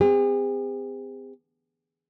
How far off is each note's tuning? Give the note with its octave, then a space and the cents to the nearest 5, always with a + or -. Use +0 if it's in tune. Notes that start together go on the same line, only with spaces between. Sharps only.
C4 -35 G#4 -45